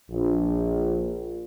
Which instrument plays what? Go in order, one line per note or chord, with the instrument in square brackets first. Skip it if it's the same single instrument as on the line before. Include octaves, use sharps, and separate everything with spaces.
[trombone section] A#1